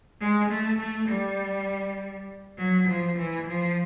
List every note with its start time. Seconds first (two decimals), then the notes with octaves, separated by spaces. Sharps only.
0.20 G#3
0.50 A3
0.79 A3
1.08 G3
2.58 F#3
2.87 F3
3.18 E3
3.47 F3